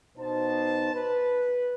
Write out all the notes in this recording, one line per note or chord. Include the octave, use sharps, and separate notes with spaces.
B2 D#4 C5 A5
B4